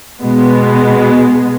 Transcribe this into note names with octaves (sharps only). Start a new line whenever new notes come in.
B2 G#3 B3